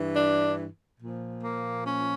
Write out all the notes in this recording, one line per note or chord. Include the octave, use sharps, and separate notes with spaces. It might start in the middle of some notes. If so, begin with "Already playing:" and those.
Already playing: G2 E3
D4
A#2 F3
A#3
C#4